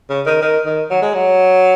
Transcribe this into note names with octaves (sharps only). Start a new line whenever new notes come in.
C#3
D#3
D#3
D#3
F#3
G#3
F#3